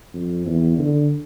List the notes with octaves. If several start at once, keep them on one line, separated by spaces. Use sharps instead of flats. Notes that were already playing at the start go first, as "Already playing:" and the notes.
F2
E2
D3